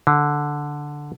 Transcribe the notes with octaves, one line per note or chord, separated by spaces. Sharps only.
D3